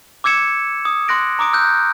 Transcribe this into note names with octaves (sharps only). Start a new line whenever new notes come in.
D6 E6 G#6 C#7 E7
D#6
C6 D#6 F#6 A#6 D7
A#5 D6 D#6 D7
E6 F#6 G6